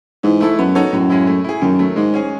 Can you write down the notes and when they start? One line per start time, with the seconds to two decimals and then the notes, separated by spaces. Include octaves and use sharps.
0.23 G#2 E3
0.41 A3 E4 A4
0.58 F#2 B3
0.75 D#4 F#4 A4 C#5
0.93 F#2 A2
1.10 G#3 C#4 E4
1.27 A3
1.44 E4 G#4
1.61 F#2 D#3
1.79 F#3 A3
1.96 G#2 G#3
2.14 C#4 G#4